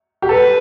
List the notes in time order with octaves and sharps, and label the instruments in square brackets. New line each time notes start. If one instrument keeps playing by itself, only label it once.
[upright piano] G4
[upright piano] A4 [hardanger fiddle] B4